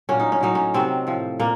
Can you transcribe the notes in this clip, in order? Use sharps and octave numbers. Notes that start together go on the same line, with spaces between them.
A#2 F#3 C#4
D#4
C#4
A2 F#3 D#4
C#4
C3 D#3 F#3 C4
A2 F3
A#2 A#3